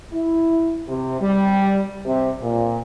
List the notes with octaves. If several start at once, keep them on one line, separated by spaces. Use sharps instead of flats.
E4
C3
G3
C3
A#2